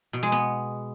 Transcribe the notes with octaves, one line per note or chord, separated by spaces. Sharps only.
B2
G#3
B3